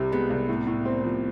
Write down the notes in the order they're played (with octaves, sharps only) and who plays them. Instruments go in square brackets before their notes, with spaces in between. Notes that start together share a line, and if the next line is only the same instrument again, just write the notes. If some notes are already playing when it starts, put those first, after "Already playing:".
Already playing: [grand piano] C2 C3
[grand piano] G#3 [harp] B3
[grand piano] C2
A2
A2
C4
F3